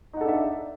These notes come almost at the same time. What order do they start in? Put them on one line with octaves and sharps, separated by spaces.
D#4 F#5 A4 D4 E5